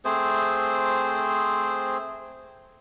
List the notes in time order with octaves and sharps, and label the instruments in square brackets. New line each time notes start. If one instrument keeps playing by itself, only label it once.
[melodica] A3 C4 G#4 C5